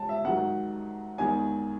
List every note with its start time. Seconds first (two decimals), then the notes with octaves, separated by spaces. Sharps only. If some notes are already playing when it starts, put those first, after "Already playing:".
Already playing: G#3 A5
0.09 E5
0.25 G#2 D#3 F#3 F#5
1.18 E2 D#3 G#3 G#5